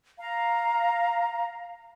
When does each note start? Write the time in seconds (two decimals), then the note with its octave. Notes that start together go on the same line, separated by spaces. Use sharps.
0.19 F5 A#5